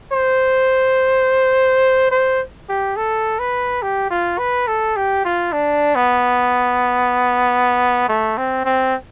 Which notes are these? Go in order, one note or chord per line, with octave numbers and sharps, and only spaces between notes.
C5
C5
G4
A4
B4
G4
F4
B4
A4
G4
F4
D4
B3
A3
C4
C4